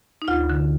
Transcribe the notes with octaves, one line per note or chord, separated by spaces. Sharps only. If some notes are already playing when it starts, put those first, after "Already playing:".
D#4
D2 F4
D3